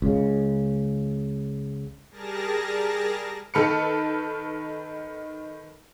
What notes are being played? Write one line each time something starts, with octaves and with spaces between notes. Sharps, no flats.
C#2 C#3
G3 G#4 A#4 A5 A#6
D#3 A4 B4 F6 C#7